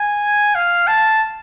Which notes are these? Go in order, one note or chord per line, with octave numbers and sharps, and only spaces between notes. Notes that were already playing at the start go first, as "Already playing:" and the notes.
Already playing: G#5
F5
A5